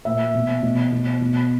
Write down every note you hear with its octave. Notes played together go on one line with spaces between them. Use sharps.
A#2 E5
B2
B2
B2
B2